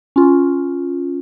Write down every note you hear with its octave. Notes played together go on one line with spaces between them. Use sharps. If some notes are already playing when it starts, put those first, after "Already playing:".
C#4 F4